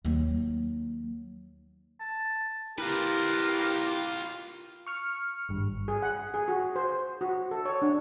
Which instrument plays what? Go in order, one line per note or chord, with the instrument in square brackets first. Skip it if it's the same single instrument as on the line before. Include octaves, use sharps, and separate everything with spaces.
[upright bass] D#2 F#3
[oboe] A5
[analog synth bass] E4 [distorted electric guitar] F4 B4 [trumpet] G4 [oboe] A#4
[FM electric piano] C#6 F6 C#7
G#1 G2
[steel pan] G#4
F#5
G#4
F#4
C5
F#4
A4
C#5
D4